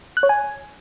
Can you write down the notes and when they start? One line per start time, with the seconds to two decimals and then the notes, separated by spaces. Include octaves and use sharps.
0.17 F#6
0.23 C#5
0.29 G#5